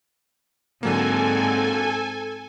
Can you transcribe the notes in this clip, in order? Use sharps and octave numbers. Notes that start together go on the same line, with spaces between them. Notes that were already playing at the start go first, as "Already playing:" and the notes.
G#2 D3 F#3 A#3 C4 A4 G#5